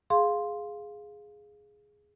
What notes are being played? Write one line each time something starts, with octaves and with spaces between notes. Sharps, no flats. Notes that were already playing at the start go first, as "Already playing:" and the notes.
G#4 F5 C6